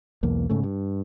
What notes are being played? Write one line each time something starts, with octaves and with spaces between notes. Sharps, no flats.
B1 E2 A#3
G#2 C#3 A3
G2